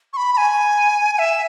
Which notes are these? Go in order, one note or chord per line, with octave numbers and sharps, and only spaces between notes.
C#6
B5
B5
G#5
G#5
E5